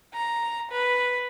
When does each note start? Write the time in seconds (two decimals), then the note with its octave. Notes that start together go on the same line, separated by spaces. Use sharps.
0.14 A#5
0.70 B4